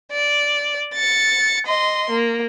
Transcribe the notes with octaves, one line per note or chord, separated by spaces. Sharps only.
D5
A6 C#7
D#5 C6
A#3